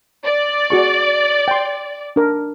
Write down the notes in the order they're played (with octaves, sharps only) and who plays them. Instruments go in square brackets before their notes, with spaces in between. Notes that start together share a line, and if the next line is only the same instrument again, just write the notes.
[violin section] D5
[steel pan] F#4 G#4 C#6
G5 C6
D4 A#4